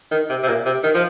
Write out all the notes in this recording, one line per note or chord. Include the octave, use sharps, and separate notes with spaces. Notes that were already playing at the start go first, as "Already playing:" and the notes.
D#3
C3
C3
A#2
C3
D#3
F3